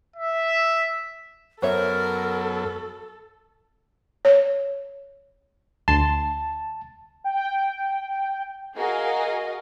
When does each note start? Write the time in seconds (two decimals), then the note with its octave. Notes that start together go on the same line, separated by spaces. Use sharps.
0.16 E5
1.62 F#2 F#3 B3 A4 A#4 C5 C#5 E5
4.25 C#5
5.88 D2 A5 C6
7.24 G5
8.76 F#4 G#4 A#4 D#5 F5